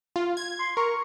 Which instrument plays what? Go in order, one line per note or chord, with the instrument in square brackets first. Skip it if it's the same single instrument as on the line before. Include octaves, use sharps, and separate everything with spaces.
[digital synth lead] F4
G#6
[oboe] C6
[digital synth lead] A#4 [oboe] C#6